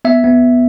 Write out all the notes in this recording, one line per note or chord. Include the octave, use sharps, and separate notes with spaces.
B3 E5
B3